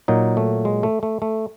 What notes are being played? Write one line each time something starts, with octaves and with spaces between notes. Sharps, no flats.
A#2 F#3 D#4
A3
G#3
A3
A3
A3